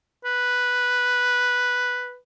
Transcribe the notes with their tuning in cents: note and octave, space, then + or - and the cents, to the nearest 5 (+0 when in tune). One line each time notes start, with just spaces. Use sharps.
B4 +0